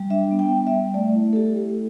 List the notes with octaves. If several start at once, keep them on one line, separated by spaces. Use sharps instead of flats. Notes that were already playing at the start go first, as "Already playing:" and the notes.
Already playing: G3
D4 E5
B3
G5
G3
E5
G3
A3 D5
E4
A4
E4 G4
A3